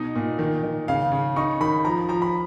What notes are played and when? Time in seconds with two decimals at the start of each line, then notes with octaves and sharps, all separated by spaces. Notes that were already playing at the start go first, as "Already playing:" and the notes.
Already playing: B2 D#4 D#5
0.15 A#2
0.39 D#3
0.63 D#3
0.88 C#3 F5
1.11 C#3
1.36 D#4 C#6
1.61 D#3 B5
1.85 F3 A#5
2.09 F3 A#5
2.22 B5